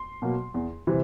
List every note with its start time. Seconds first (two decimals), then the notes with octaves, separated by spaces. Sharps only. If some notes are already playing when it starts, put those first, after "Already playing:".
Already playing: C6
0.22 B2 F#3 A#3
0.54 E2
0.87 C3 E3 G3